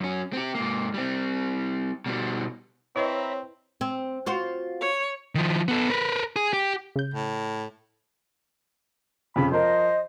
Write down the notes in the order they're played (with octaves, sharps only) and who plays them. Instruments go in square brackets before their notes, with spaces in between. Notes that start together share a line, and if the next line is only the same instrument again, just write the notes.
[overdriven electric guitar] F#2 C#4
C4 G4
G#2 A#3
G3 C4
B2 G3
[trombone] C4 [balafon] E4 B4 D#5 [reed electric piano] C#5 [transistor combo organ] E5 A#5 B5
[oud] C4
F4 F#4 C5
[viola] C#5
[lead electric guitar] D#3 F3
B3 A4
A#4 B4
G#4
G4
[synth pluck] C#3 G6
[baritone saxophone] A2
[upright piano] F2 C#3 [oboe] B5
[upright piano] F3 A#4 [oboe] C5 [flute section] D#5